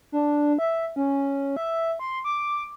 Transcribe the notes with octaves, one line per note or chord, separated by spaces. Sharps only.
D4
E5
C#4
E5
C6
D6